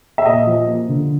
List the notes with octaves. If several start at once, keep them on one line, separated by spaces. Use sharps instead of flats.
E5
A#2 D#5
F3
A#3
D3